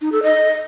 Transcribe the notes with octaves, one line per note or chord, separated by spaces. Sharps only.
D#4
A4
D#5